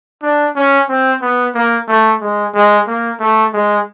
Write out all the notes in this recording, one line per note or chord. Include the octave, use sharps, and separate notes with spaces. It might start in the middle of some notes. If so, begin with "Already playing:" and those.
D4
C#4
C4
B3
A#3
A3
G#3
G#3
A#3
A3
G#3